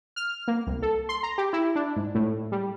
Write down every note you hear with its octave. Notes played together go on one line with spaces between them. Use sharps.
F6
A#3
C2
A4
C6
A#5
G4
E4
D4
G#2
A2
G3